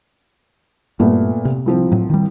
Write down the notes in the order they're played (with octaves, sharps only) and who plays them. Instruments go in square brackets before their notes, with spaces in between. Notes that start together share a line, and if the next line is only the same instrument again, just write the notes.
[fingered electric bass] G2 [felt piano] A#2 A3 B3
[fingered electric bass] C3
[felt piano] C2 F3 C4
[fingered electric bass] A2 F#3
D#3 G3